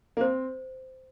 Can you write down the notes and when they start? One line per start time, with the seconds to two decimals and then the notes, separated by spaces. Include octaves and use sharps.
0.17 A#3
0.21 C4 C5